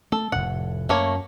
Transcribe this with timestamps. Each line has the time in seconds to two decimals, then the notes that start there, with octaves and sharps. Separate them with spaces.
0.12 A3 A4
0.32 F1 A2 F#5
0.89 F#2 A3 A#3 C#5